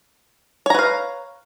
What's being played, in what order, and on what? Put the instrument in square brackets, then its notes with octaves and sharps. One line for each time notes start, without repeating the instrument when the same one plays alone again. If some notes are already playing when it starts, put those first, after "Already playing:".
[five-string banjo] C#5
A#5
B4
F5